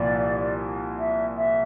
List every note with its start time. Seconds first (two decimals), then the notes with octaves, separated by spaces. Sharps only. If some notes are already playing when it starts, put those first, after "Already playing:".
Already playing: C2 A#2 F3 D5
0.99 E5
1.36 E5